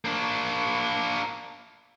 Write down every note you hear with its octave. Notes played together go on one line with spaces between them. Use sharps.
A#3 D4